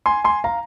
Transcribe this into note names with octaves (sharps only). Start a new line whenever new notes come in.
G#5 C6
G#5 C6
F5 A#5